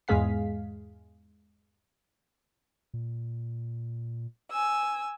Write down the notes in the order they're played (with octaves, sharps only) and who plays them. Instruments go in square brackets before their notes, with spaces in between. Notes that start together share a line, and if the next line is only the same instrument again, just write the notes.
[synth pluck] E2 G#2 G#3 G#4 F5 B6
[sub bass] A#2
[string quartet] G#5 E6